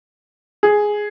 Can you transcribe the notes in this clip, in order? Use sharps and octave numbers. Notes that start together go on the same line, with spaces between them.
G#4